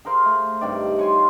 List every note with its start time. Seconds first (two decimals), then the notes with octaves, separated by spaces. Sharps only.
0.05 G#4 A#4 C5 F5
0.26 A3
0.61 G2 C3 D#3 D5
0.99 C#5 G#5 C6
1.15 F4